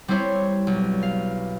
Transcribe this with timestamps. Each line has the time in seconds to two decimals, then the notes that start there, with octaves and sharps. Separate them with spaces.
0.08 G3 C4 E4 C5 C#5
0.67 B1
1.03 F5